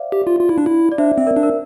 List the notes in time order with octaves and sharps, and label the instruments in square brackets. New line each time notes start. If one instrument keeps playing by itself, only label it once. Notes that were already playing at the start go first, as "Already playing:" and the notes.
Already playing: [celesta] C5 D5 E5 F5
[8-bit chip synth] G4
F4
F4
E4
D4
E4
[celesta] D5
[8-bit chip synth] D4 [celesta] C5 E5
[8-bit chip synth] C4 [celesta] E5
[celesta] A#4 D5
[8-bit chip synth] D4
[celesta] A#4